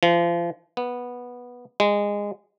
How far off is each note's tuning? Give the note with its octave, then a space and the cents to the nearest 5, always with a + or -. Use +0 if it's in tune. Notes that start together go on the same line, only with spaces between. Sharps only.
F3 -30
B3 -10
G#3 -20